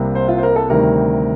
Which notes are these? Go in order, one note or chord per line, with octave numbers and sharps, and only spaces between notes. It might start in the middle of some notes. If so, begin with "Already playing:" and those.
Already playing: C2 C3 G3 A#3
C5
F4
C5
A#4
A4
D2 C3 D#3 G3 A#4